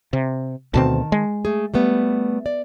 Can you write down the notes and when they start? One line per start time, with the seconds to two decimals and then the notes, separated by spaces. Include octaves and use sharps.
0.13 C3
0.74 D2 B2 D#3 C4 A5
1.12 G#3
1.45 A3 G#4
1.74 G3 A3 B3
2.46 D5